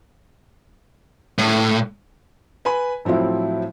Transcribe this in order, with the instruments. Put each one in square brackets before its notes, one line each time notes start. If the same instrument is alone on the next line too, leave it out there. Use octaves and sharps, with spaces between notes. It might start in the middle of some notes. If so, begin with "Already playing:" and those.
[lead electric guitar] A2
[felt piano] B4 G#5 B5
A2 F3 F#3 C4 E4